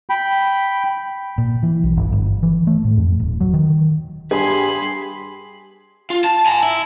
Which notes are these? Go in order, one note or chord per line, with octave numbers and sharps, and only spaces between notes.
G5 B5
A#2
E3
B1
G1
G1
E3
A3
A2
F2
D#1
F#3
D#3
G2 G4 G#4 G#5 B5 C6
F4
A5
G#5 A#5
E4